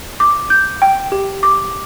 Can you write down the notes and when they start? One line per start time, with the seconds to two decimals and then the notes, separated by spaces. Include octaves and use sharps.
0.20 D6
0.50 G6
0.82 G5
1.12 G4
1.43 D6